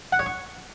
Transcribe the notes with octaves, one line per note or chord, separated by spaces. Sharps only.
F#5
C#5
C#6